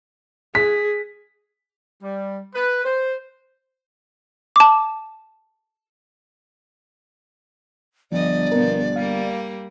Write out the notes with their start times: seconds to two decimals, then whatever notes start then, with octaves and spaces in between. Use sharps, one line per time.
0.55 G#4 B6
2.03 G3
2.55 B4
2.85 C5
4.56 A5 D6
8.12 G1 G2 F3 D5 D#5
8.52 B2 F3 B3 A#4
8.96 G3 A#3 F5